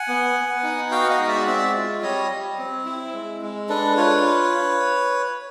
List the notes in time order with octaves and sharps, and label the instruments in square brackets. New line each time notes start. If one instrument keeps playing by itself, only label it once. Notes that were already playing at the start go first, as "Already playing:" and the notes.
Already playing: [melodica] F#5 G#5
B3
B3
D#4
F#4 F5 G5
F#5
D#5 F5
G#3
D5 E5
C4 D5 E5
F4
G3 C#5 D#5
G3
C4
E4
G#3
G#3
D4 A4 B4
F4 B4 C#5